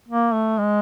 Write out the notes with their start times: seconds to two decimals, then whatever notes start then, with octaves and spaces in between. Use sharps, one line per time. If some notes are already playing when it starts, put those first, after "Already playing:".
0.09 A#3
0.34 A3
0.59 G#3